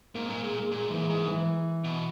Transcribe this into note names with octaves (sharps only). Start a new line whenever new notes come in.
G#2 A#3
A#2 A#3
A#2 G#3
G#3
A#2 G#3
G#2 E3
G#2 G#3
E3
B2